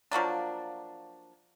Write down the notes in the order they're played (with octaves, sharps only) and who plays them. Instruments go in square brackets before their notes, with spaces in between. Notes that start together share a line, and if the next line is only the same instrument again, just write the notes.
[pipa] F3 F#3 A#3 D4